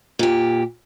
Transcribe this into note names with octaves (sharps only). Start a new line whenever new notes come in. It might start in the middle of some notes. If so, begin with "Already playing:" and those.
A#2 G4